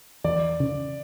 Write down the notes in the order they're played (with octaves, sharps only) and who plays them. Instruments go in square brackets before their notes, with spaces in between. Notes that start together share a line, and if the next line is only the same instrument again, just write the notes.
[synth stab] E2 [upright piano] D5
[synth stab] C#3